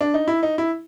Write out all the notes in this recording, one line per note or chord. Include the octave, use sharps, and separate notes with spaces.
D4
D#4
E4
D#4
E4